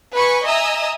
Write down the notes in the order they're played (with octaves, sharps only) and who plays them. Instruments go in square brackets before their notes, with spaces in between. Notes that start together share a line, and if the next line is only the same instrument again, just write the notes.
[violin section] B4 G#5 B5 C#6
D#5 E5 G#5 A#5 D#6 E6